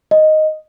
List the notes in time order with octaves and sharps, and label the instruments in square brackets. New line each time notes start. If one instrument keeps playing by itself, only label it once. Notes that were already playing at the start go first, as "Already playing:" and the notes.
[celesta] D#5